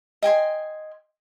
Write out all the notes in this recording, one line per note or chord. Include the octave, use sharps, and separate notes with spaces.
D#5 G5 G#5 C6